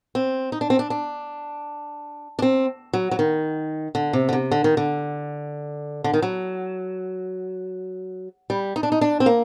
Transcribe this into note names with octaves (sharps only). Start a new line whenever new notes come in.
C4
D#4
D4
C4
D4
D4
D4
C4
F#3
F#3
D#3
D3
C3
D3
C3
D3
D#3
D3
D3
D#3
F#3
G3
D#4
D4
D#4
D4
C4
A#3